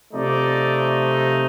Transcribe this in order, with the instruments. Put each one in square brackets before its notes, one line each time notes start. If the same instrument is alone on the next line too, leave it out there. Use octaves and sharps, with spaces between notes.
[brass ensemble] C3 F3 A3 D#4 D5